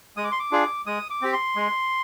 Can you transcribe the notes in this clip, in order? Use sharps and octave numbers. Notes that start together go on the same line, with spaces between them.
G#3 D#6
D6
C6
D6
D4 F4 G#4
G#3 D#6
D6
C4 G4
C6
G#3